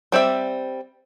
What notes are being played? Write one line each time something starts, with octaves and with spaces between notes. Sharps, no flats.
G3 C4 D5 E5